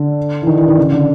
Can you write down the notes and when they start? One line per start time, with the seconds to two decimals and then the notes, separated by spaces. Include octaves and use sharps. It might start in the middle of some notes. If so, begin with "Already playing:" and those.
Already playing: D3
0.42 E3
0.47 D#3
0.57 E3
0.68 D#3
0.77 C#3
0.92 D3